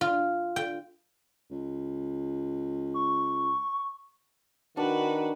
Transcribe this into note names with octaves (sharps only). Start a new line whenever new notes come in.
F4
G5
C#2
C#6
D#3 D4 F#4 B4